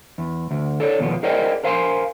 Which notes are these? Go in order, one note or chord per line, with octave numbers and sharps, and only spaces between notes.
E2
D2
A4 C#5 D5
D#2 B2 E3 F3 B3
G#4 A#4 C5 D5 D#5 G5
A#4 C5 F5 G#5 A5 C6